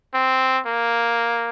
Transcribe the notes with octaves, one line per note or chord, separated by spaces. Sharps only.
C4
A#3